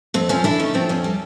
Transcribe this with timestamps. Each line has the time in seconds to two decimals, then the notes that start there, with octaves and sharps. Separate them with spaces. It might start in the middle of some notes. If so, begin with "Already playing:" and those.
0.14 F2 C4
0.29 F3 C#4
0.44 D3 D4 E4
0.59 A3 C#4 D#4
0.74 F3 C4 D4
0.89 F2 C#4
1.04 G3